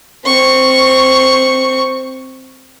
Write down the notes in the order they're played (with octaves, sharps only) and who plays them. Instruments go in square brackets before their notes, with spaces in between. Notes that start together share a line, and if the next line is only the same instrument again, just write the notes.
[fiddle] C4 C#6